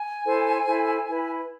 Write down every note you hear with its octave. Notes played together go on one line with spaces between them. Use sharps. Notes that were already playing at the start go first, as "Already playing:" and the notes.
Already playing: G#5
E4 A4 C5
E4 A4 C5
E4 B4